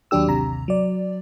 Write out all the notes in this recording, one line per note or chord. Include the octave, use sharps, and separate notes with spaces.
D#2 F#3 D4 G4 E6
A1 D#2 C3 A#5
F#3 D5